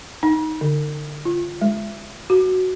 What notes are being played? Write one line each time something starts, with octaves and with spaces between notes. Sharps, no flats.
D#4
D3
F4
G#3
F#4